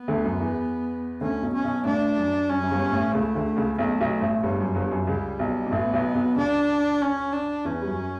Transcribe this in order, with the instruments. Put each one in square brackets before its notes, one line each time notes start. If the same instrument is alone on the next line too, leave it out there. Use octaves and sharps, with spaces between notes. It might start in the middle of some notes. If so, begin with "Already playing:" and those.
Already playing: [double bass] B3
[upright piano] D2 D3
F#2 F#3
E2 E3
[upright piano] D2 D3 [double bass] C#4
[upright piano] B1 B2
[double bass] C#4
[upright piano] B1 B2
[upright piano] A1 A2 [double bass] D4
[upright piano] F#2
[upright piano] F#2 [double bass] C#4
[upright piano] F#2
G1 G2
A1 A2
[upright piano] C#2 C#3 [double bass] A3
[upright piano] D2 D3
C#2 C#3
[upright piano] B1 B2 [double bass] A3
[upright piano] B1 B2
A1 A2
[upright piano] G1 G2 [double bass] G3
[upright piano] F#2
G1 G2
F#2
[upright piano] C#2 C#3 [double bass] G3
[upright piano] B1 B2
B2
[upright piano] A1 A2 [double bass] B3
[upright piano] B1 B2
B1 B2
[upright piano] C#2 C#3 [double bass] D4
[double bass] C#4
D4
[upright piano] E2 E3 [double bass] C#4
[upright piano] G3
F#2 F#3